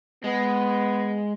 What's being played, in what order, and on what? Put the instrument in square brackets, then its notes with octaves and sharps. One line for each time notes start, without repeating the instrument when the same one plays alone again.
[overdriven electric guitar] G#3 [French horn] B3